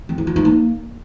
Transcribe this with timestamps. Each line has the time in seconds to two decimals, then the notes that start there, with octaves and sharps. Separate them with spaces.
0.09 C4
0.18 E4
0.27 F4
0.36 D#4
0.45 A#3